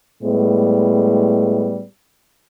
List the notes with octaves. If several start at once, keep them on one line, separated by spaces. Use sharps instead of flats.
A2 G3 G#3 B3